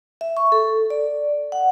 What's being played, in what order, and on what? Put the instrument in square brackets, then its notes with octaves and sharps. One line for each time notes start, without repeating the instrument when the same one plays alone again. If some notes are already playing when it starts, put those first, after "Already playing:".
[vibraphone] E5
C#6
A4
D5
F#5